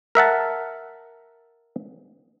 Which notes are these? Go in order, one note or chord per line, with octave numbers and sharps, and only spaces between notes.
A#4 E5 F#5 A5